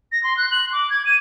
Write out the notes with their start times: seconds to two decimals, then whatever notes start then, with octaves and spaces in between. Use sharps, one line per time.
0.12 A#6
0.23 C6
0.37 F#6
0.52 F#7
0.73 D6
0.90 G#6
1.05 D#7